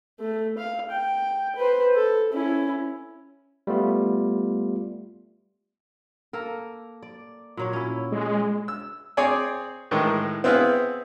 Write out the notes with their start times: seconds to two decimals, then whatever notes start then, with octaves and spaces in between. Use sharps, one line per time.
0.20 A3
0.58 F5
0.91 G5
1.56 B4 C5
1.95 A4
2.33 C#4 E4
3.67 G3 A3 B3 F4
6.33 A#3 A4 A#4
7.03 D5
7.57 A#2 F#3 C#5
7.73 C#4 E4
8.12 G#3
8.68 E6
9.17 C4 G#4 C#5 D5 G#5
9.91 A2 D#3 E3 G#3
10.44 B3 C4 E4 G#4 B4 F5